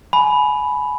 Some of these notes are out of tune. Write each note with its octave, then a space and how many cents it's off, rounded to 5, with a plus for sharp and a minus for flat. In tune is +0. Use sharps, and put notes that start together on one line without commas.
G#5 +25 B5 +0